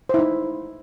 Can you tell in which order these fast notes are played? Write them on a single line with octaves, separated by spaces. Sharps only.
C5 E4 D#4